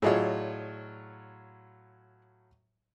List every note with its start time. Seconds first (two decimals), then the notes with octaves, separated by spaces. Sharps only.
0.02 A2 F#3 F4 G#4 D5 D#5